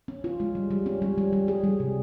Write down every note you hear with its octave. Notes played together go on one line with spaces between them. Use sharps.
C#4
F4
G#3
G3
G3
C#4
G3
G3
G3
G#4
G3
C3